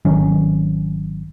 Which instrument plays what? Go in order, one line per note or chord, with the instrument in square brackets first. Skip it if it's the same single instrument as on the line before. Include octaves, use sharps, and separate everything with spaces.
[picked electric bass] G#1 D#3 F#3 C#4